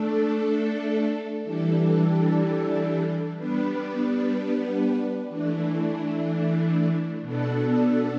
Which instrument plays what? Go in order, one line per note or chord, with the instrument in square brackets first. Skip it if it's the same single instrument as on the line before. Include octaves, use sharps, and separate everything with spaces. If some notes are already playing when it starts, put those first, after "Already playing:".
Already playing: [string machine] A3 D4 A4
E3 G3 D4 A4
G3 B3 D4 B4
E3 A3 D4
B2 B3 D4 A4